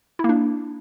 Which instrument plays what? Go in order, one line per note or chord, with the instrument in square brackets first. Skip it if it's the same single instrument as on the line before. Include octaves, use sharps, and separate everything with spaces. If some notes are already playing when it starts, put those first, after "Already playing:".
[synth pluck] E4
A#3
D4